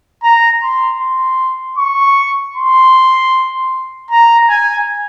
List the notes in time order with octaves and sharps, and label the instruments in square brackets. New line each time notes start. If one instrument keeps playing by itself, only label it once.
[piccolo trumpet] A#5
C6
C6
C#6
C6
A#5
G#5